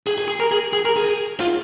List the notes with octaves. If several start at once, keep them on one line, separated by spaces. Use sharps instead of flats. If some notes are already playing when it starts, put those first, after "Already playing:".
G#4
G#4
G#4
A#4
G#4
G#4
A#4
G#4
F4